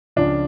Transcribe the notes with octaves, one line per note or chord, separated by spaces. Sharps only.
C#2 C#3 F3 D4